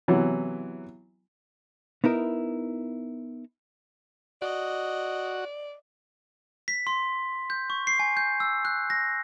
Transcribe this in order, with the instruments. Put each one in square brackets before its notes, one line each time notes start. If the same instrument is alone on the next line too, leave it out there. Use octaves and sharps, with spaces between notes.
[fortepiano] C3 E3 F#3 B3
[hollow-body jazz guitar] B3 D#4 E4 A#4
[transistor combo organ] F#4 [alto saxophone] D5 [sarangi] D#5
[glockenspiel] B6
C6
G6
C#6
C7
G#5
G6
E6
F#6
A#6